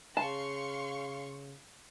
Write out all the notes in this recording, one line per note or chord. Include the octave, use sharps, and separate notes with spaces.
C#3 F5 A5 C6 C#6